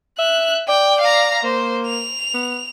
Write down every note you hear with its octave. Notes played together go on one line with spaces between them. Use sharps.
E5 F#6
D5 G5
F5 A#5
A#3 C5
F7
B3